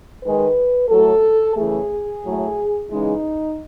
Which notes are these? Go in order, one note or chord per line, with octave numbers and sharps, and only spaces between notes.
D#3 G#3 B4
A2 F#3 A3 A4
C#3 E3 A3 G#4
A2 F#3 A3
C#3 E3 G#3 D#4